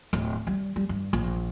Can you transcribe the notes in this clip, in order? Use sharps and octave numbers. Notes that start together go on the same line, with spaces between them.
D1
G3
G3
G2
A#1